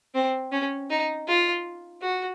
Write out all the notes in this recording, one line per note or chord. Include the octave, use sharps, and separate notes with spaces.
C4
C#4
D#4
F4
F#4